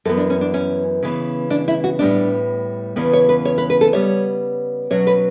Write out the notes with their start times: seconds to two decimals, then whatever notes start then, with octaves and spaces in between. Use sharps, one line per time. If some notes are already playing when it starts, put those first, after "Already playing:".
0.05 F#2 E3 B3 A4
0.17 D4
0.30 C#4
0.41 D4
0.54 C#4
1.03 C#3 E3 B3
1.50 D4
1.68 E4
1.84 F#4
1.99 A2 G3 B3 D4
2.96 E2 C#3 E3 B3
3.13 C#5
3.29 B4
3.45 C#5
3.58 B4
3.70 B4
3.81 A4
3.93 C#3 G3 B3 C#5
4.90 B2 F#3 C#4 C#5
5.07 B4